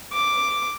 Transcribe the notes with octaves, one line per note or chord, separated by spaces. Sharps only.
D6